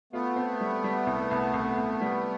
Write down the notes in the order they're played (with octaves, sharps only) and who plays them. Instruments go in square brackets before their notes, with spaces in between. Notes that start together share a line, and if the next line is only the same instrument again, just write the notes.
[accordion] A3 B3 [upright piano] F4
[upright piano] C4
G3
G3
C2
C2
C2
C2
G3